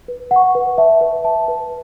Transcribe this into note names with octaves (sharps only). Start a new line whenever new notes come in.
B4
F#5
C#6
B4
E5 A5
B4
E5 A5
B4